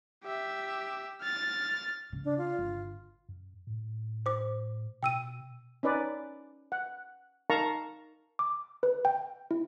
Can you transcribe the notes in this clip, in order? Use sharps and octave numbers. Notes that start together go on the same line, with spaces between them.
G4 E5
F6 A6
C#3
D4
F4
G1
F#2
A2
C5 D6
B2 G5 E6 D#7
C#4 D#4 B4 D5
F#5
D#4 A#4 F5 A5 A#5 C#6
D6
B4
G5
E4